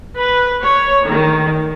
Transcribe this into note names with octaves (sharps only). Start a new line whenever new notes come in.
B4
C#5
D#3